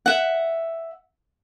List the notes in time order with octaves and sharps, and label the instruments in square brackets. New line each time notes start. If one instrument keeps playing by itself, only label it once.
[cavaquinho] E5 F#5